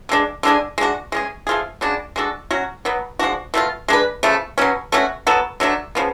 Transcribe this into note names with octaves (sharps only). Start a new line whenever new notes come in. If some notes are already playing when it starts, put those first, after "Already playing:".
D3 G#3 D4
D3 G#3 D4 G#4
G#3 D4 F#4
G#3 C#4 G#4
F3 A3 F4 G#4
C#3 G#3 D4 F#4
G#3 D4 F#4 A4
F#3 C#4 F#4
B2 F#3 B3
F3 G#3 D4 F#4
B2 A3 D4 F4
G#3 D4 G#4 B4
C#3 F3 A3
B2 F#3 C#4
B2 A3 C#4 F#4
F#3 B3 F#4 A4
D3 F#3 A3 D4
C#3 F3 B3